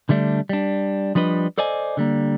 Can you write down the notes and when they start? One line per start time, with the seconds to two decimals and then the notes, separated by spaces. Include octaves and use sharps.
0.09 D3 G3 A3 D4
0.49 G3 D4
1.15 F3 G3 D4 B4 D#5
1.58 A4 C5 D5 D#5 G#5
1.97 D3 G3 A#3